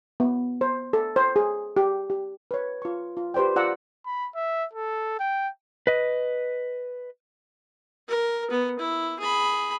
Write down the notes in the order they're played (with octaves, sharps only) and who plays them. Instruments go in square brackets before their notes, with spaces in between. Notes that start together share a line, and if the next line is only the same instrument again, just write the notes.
[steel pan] B3
C5
A4
C5
G#4
G4
G4
B4 C#5
F4 C#6
F4
G4 B4 C5 D5 G5
F4 D5 F#5 A#5 E6
[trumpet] B5
E5
A4
G5
[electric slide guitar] B4 D#5
[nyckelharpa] A#4
B3
E4
G#4 B5